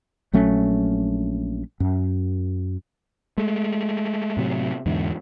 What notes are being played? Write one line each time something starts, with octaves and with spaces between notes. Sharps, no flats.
A#1 F#3 A3 C#4
F#2
G#3 A3
A2 C3 F#3
E2 G#2 D3